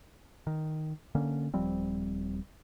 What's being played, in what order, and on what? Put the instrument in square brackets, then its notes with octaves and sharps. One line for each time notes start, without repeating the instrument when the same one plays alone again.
[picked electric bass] D#3
D3 A#3 C#4
D#1 F3 G3 C4